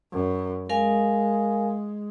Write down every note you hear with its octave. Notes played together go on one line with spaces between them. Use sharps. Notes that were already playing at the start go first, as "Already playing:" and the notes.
F#2
G#3 A#4 F5 G#5